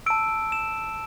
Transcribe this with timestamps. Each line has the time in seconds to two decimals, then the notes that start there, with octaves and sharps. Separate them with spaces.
0.06 A5 E6 D7
0.52 E7